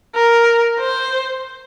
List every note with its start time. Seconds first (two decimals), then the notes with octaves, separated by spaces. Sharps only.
0.15 A#4
0.80 C5